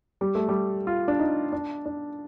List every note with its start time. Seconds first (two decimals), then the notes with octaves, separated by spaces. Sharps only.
0.21 G3
0.35 A3
0.49 G3
0.87 F4
1.08 D4
1.20 D#4
1.53 D4
1.86 D4